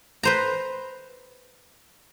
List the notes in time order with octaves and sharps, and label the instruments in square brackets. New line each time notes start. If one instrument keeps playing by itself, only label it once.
[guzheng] B4 C5 A#5